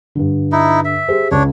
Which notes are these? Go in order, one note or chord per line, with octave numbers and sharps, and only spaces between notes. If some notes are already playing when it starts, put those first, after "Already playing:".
G2 D3
D#4 E4
E5
G4 G#4 C5
C#2 D4 C#5